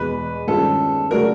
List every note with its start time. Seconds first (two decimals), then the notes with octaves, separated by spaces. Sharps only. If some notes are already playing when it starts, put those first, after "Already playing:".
Already playing: E2 B2 G#3 B4
0.47 G2 D#3 G#3 C#4 F4 A4
1.11 C#3 F#3 A3 D4 F#4 A#4